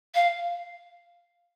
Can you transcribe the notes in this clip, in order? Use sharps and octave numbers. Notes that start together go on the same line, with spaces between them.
F5